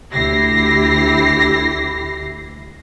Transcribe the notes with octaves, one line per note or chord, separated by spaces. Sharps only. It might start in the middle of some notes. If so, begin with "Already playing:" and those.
D2 E4 G4 A#6 C7